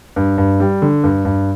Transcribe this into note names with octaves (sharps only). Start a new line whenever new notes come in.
G2
G2
G3
D3
G2
G2